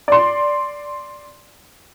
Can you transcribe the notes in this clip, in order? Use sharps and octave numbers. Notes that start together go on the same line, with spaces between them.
D5 C6